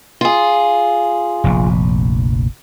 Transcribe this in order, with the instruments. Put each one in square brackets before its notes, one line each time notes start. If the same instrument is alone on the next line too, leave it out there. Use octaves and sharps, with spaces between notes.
[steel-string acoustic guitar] F4 G#4
[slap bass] F1 A#1